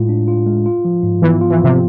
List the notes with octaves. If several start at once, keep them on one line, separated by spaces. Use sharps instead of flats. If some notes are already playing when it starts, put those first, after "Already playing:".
Already playing: A2 G#3 F4
D4
F4
G#3
F4
F3
G#2
E3 B3
F4
E3
F3
C3